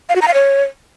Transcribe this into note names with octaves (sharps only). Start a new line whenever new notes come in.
F5
F#4
A#5
F5
C#5